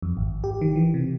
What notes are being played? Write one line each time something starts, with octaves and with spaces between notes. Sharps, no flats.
F2
G#1
G4
D#3
E3
C3